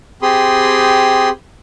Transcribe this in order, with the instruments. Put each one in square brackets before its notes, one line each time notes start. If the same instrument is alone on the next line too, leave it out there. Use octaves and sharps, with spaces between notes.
[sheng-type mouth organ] C4 G4 G#4 B5 C6 D#6